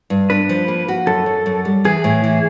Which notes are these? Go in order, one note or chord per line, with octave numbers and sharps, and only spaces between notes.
G2
D4 B4
F3
A#3
F#4
F#2 A4
F#2
F#2
G3
E3 G#4
A2
E3